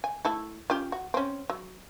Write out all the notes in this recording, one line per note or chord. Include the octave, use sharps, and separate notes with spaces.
G#5
A3 E4 A4
C#4 F4 G4
F#4
C4 C#4
F#3